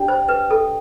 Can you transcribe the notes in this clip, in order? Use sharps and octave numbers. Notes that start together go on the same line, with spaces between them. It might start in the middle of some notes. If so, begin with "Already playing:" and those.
Already playing: D4 G4 D5 G5
C5
B4
A4